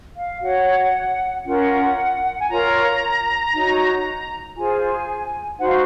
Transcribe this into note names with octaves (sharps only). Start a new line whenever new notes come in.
F5
F#4 C#5 F#5
C#4 F4 A#4 F#5
G#5
F4 A#4 C#5 A#5
D#4 F#4 C#5
F4 G#4 C5 G#5
D#4 F#4 C5 F#5
F5